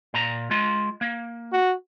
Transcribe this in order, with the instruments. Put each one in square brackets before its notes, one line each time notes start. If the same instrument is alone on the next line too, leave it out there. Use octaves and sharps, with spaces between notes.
[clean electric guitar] A#2 A#5
G#3 F4
A#3
[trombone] F#4